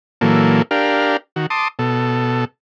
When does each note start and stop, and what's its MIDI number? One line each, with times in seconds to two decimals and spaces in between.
0.21 0.62 46
0.21 0.62 52
0.21 0.62 54
0.21 0.62 58
0.21 0.62 69
0.71 1.17 62
0.71 1.17 67
0.71 1.17 70
0.71 1.17 77
1.36 1.46 51
1.36 1.46 66
1.50 1.68 81
1.50 1.68 84
1.50 1.68 86
1.50 1.68 87
1.79 2.45 47
1.79 2.45 69